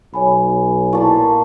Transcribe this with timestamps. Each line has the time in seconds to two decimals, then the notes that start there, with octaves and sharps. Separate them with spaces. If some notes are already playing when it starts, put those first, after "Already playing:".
0.14 B1 C#5 G#5 B5
0.93 A#2 E4 A5 C#6